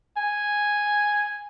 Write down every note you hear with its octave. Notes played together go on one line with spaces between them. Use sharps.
G#5